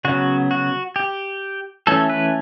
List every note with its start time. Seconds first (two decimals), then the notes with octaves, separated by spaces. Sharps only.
0.05 C#3 F#3 B3 F#4
0.51 F#4
0.96 G4
1.87 E3 A3 C#4 A4
2.10 B4